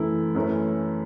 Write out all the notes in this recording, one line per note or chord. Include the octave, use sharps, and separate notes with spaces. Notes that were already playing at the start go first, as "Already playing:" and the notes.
Already playing: F#2 E3 A3 E4
F#2 E3 A3 C#4 E4